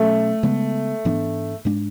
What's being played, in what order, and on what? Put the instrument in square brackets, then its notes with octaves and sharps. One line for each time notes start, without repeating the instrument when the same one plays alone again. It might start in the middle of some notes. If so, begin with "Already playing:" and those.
Already playing: [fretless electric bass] B2 F#3 C#4 [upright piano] A3
[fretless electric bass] C#3 G#3 B3
G#2 E3 B3 D4
G#2 G#3 D4